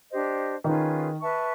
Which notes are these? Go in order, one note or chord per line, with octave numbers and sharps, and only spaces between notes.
D4 G4 C5 D#5
D#3 C#4 D#4 F4 G#4 B4
B4 E5 A5 C#6